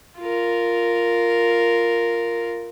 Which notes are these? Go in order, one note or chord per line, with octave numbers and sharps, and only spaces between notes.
F4 A#4